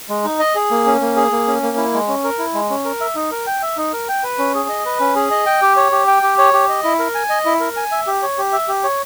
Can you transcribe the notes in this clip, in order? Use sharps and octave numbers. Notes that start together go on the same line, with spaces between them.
G#3
D#4
D#5
G#4
A#3
C#4
A#3
G#4
A#3
C#4
A#3
E4
G#3
C#4
A#4
E4
G#3
C#4
A#4
E5
D#4
A#4
G5
E5
D#4
A#4
G5
B4
C#4
G#4
D#5
B4
C#4
G#4
D#5
G5
G4
C#5
G4
G5
G4
C#5
G4
D#5
E4
A#4
G#5
D#5
E4
A#4
G#5
E5
G4
C#5
G4
E5
G4
C#5